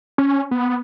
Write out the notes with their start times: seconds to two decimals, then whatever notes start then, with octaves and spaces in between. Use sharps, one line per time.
0.18 C#4
0.51 B3